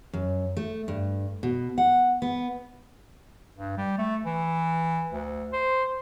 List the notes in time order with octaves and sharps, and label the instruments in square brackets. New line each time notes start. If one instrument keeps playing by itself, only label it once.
[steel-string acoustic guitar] F#2
A3
G2
B2
F#5
B3
[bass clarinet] G2
G3
A3
E3
D2
C5